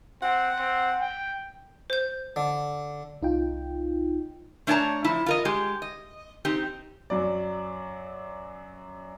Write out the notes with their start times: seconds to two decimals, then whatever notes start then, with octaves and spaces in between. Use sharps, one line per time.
0.22 C4 F#5
0.58 C4
1.01 G5
1.90 C5 G6
2.36 D3
3.22 C2 D#4 F4 G5
4.67 A3 D4 C#5 D5 A5 A#5
5.04 F3 E4
5.26 F4 A#4 D#5
5.45 G#3 G4
5.82 D#5
6.45 C4 D#4 G4
7.10 F#2 F#3 D5